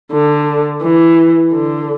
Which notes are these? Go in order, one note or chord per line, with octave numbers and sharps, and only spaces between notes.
D3
E3
D3